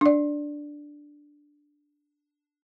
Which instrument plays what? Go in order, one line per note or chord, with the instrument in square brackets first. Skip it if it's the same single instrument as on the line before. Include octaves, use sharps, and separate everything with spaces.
[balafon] D4 D5